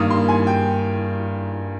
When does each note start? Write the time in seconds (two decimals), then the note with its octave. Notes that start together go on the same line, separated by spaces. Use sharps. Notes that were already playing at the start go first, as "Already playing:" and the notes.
Already playing: G2 D#3 A#3 D#6
0.11 C6
0.28 G#5
0.47 G5